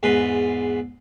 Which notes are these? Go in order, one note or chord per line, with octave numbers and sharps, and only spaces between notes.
E2 G#2 B4 C6